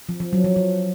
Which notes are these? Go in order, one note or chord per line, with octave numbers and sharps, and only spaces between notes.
F3
F3
F#3
F3
F3